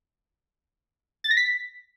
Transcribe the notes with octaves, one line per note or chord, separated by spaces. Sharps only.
A6
A#6
B6